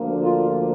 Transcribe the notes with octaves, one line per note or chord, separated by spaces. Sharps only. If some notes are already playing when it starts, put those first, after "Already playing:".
Already playing: D2 D3 F3 A#3 D4
F4